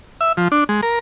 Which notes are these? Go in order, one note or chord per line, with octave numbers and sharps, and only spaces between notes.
E5
F3
D4
G#3
A#4